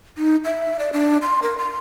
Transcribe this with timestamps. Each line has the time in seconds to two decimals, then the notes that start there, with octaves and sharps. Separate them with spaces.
0.18 D#4
0.44 E5
0.79 D5
0.93 D4
1.22 C6
1.43 A#4
1.58 C6